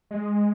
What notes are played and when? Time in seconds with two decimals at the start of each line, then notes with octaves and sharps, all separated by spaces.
0.11 G#3